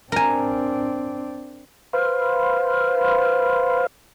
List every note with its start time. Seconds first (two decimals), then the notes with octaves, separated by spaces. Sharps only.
0.12 C4 D4 A#4 G#5
1.93 B4 C5 F5